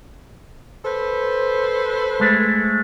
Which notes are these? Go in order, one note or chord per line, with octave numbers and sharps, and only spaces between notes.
A4 B4 C5
G#3 A3